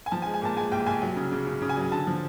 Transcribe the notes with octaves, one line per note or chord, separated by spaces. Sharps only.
G#5
F3 A5
G#5
G#3
G#5
A#2 A5
G#3 G#5
C2 G5
C2 G#5
F#3
C#3
C#3
C#3
C#3
G#5
F#3
D3 A5
F3